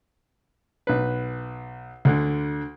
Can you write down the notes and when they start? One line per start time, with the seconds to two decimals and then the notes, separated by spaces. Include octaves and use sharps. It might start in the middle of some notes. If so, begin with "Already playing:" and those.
0.87 B1 B4
2.05 D2 D3